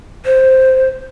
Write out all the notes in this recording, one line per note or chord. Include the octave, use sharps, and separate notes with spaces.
C5